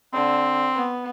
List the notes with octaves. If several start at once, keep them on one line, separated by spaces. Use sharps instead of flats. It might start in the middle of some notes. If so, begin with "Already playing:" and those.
D3 C4
B3